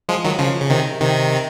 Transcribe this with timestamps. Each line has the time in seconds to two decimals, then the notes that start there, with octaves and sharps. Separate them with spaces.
0.09 F3 G#3
0.25 D#3 F#3
0.39 C#3 F3
0.61 C#3
0.70 C3 D#3
1.00 C3 D#3